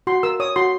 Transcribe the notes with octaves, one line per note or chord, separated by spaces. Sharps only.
F#4 C6
A#4 E6
C#5 D#6
F#4 C6